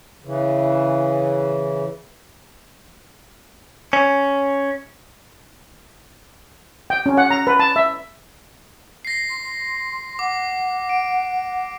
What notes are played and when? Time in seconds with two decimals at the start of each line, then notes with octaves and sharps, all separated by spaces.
0.24 C#3 E3
3.93 C#4
6.90 G5
7.06 C#4
7.17 F#5
7.30 A#5
7.47 B4
7.60 A5
7.76 E5
9.05 A#6 C7
9.30 C6
10.19 F#5 D6
10.89 D7